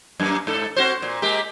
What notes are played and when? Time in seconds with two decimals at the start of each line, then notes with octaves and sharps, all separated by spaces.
0.20 F#2 A#3
0.47 G#2 A4
0.76 C4 F#4 C5
1.02 A#2
1.22 G#3 A#3 G4